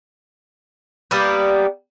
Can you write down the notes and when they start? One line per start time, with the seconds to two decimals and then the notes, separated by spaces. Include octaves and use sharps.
1.11 G3 A#3 B3